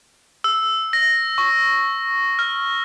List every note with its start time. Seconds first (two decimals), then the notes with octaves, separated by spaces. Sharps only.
0.44 E6
0.93 A#6
1.38 C#6
2.39 F6